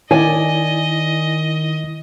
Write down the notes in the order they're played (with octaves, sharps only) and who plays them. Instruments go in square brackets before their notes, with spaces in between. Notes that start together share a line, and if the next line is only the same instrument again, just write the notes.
[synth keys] D#3 [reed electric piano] E4 [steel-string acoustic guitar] D5 G#5 [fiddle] D#5